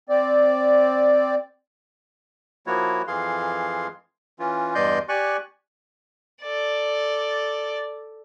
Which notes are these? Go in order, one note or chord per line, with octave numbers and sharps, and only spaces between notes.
C4 D5
F3 A#3 E4 F#4 C#5
F2 E3 G#4 F5 C6
E3 C#4 F4
E2 G2 D5 D#5 C6 G6
G4 D5 G#5 C#6 F#6
A4 D5